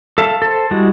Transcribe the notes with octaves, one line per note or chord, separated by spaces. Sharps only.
A4 E5 F5 A5
A4 C5
G3 G#3 E4 F#4